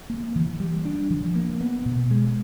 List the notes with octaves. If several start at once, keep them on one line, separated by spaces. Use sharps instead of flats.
A#3
E3
G3
D4
F3
A#3
B3
B2
G#3